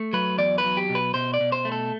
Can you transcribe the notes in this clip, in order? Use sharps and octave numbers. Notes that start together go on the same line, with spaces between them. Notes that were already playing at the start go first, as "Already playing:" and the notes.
Already playing: A3
F#3 B4
E2 D5
B4
F#3
G4
B2
B4
B2 C5
D5
B2
C5
A3
A4